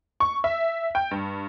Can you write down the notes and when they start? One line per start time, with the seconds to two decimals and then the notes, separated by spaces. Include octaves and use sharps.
0.20 C#6
0.44 E5
0.95 G5
1.11 G2